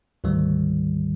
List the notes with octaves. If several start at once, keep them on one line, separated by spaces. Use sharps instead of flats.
D2 G#2 D#3 E3 G3